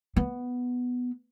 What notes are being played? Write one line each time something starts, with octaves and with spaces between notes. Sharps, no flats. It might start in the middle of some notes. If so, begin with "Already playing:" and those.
B3